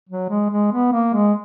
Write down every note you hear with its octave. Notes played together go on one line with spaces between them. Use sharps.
F#3
G#3
G#3
B3
A#3
G#3